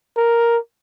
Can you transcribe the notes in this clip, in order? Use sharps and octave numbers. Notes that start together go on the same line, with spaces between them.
A#4